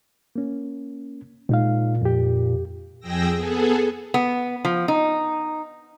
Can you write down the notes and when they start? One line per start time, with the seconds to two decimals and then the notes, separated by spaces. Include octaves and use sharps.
0.36 A#3 C#4
1.49 A#2 G#3 D#4 F5
2.01 F2 G4
3.00 F2 G#4 G5 E6 A#6
3.36 B3 G#4 A4
4.14 B3
4.65 F3
4.88 D#4